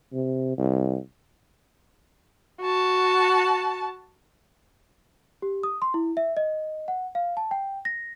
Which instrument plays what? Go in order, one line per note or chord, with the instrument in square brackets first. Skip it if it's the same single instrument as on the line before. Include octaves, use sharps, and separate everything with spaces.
[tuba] C3
C2
[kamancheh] F#4 A5
[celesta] G4
D#6
C6
E4
E5
D#5
F#5
F5
A5
G5
A#6